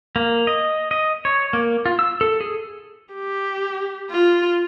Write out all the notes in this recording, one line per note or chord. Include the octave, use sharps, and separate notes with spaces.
A#3
D#5
D#5
C#5
A#3
F4
E6
A4
G#4
G4
F4